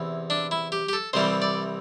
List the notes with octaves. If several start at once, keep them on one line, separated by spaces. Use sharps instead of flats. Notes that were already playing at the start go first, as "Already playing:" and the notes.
Already playing: E2 C3 E3
D4
E4
G4
G4
A4
C2 C3 E3 G3 C5
D5